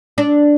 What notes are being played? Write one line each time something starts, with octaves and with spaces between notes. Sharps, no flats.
D4